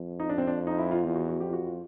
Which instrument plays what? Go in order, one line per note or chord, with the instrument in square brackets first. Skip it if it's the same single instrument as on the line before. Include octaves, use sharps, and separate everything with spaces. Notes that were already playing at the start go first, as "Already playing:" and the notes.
Already playing: [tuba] F2
[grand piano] D#4
D4
C4
D4
D#4
E4
F4
[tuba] E2 [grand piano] F4
[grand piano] F#4
F#4
[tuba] F2 [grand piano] G4
[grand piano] F4
F#4
F4